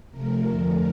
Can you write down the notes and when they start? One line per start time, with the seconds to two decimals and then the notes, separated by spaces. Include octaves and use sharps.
0.11 C3 F3 A3 A#4
0.47 F2 D3 F3 A3